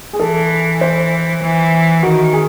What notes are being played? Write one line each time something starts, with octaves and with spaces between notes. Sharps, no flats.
G#4
E3 A4
C5
E3
D#3 F#4
G#4